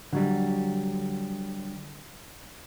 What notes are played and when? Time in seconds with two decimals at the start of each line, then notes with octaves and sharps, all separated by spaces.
0.13 D3 F#3 G3